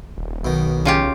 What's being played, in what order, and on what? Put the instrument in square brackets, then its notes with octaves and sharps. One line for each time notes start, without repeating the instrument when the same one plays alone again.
[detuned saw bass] D#1
[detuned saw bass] B1 [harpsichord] B2 D#3
[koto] C#3 F4 G4